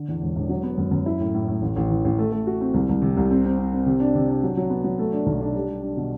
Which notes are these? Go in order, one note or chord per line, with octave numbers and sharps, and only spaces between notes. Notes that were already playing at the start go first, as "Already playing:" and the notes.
Already playing: D3
E2
E1
E1
F#3
B3
F#2
F#2
E4
A2
A2
A2
A1
A1
E3
A1
A3
A3
F#4
C4
C2
C2
C3
C2
C4
C4
C4
C4
C3
D4
C3
D4
F#3
F#3
B3
F#3
A3
D4
B1
D4
G3
G3
D4
B2